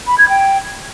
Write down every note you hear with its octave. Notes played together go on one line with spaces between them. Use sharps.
B5
G#6
G5